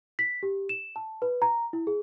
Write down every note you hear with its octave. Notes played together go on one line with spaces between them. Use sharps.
B6
G4
E7
A5
B4
A#5
E4
G#4